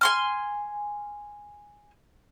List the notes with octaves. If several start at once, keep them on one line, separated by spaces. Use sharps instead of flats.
G#5 C6 F6